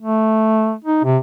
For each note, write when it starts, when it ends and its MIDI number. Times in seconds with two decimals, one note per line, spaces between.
0.01 0.74 57
0.84 1.02 63
1.04 1.18 48